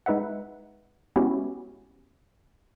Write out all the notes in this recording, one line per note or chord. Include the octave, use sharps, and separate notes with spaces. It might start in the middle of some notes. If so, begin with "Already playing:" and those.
G#3 D#4 B4 E5 F#5
G#3 B3 C#4 E4 F#4 G4